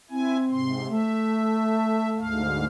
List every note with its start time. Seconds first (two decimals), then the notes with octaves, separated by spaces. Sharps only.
0.10 C4 E4 G#5
0.51 G#2 C3 C6
0.87 A3 E5
2.17 D2 G#2 F5